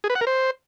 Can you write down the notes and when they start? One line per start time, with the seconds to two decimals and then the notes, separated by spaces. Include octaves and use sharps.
0.04 G#4
0.10 B4
0.15 F#5
0.21 A#4
0.27 C5